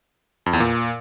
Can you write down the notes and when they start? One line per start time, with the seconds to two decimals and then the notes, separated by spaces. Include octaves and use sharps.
0.46 F2
0.53 E2
0.60 A#2